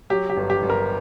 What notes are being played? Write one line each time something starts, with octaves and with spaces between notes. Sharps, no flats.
F#3 G4
G4
G1
G4
G1
A#4